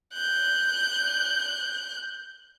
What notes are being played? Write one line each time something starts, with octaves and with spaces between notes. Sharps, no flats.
F#6 G6